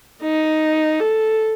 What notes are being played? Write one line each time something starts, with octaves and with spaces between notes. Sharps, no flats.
D#4
A4